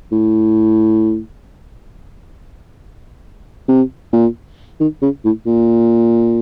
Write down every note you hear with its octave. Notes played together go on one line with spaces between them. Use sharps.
A2
C3
A#2
D#3
C#3
A2
A#2